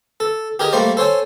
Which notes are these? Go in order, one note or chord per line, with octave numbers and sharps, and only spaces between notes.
A4
G4 G#4 A#4 D#5 G#5
G3 A3 A#3 C5 D5
A4 C5 C#5 G#5